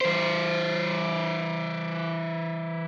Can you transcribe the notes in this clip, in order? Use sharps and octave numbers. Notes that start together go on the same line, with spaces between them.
E3 C5